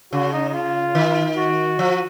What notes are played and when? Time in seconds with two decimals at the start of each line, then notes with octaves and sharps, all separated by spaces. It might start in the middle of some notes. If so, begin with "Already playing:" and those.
0.12 C#3 F#4
0.32 D#4
0.49 D#4
0.53 F4
0.95 D#3
1.37 F#4
1.79 F3